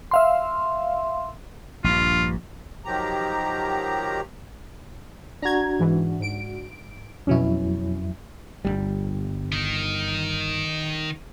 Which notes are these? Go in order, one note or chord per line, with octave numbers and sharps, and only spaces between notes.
E5 F5 C6
A#1 G2 F4
D#3 F3 F#3 G4 A#5
D4 F#4 A#5 G#6
G#2 E3
G#2 D7
F2 B2 F#3 C#4 E4
G1 D#2 G3
D#3